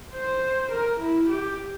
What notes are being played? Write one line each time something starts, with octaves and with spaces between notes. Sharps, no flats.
C5
A#4
E4
G4